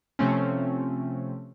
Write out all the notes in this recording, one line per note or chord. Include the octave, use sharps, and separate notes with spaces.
C3 F3 A3 C4 C#4